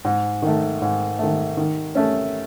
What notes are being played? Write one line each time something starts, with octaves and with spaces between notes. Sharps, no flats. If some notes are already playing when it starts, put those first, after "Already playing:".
G#2
D#3 A3
G#2
D#3 A3
D#3
A3 C#4